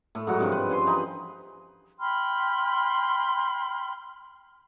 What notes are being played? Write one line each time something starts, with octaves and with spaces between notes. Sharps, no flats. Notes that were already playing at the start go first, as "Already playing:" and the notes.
A2 A3
G#2 F#3 F#4
G2 C3 F3
B4
C#4 B4 C6
E3 D#4 B5
G5 B5 C6 F6